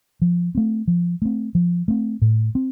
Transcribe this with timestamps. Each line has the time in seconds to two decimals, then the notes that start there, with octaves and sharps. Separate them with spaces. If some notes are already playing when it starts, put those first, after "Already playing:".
0.22 F3
0.55 A3 C4
0.87 F3
1.22 A3 C4
1.55 F3
1.88 A3 C4
2.22 A2
2.55 C4